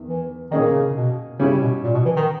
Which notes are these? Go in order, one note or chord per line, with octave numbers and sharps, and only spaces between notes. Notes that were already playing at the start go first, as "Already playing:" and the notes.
Already playing: E2 D#3
E3
A#2 D#3 A#3 C#4 G#4 D#5
C#3
B2
C#3 G3 C#4 E4
B2
A#2
B2
E3
D#3